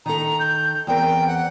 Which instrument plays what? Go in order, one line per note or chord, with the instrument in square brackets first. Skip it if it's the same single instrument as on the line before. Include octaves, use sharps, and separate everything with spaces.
[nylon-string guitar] D#3 A4 [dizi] A#5
[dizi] G6
[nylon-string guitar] E2 C4 A#4 [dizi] G5
[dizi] F#5